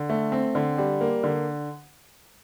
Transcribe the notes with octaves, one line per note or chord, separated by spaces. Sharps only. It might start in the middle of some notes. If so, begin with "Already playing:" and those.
Already playing: D3
A3
C4
D3
G3
A#3
D3